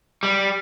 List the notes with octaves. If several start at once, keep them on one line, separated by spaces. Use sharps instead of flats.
G3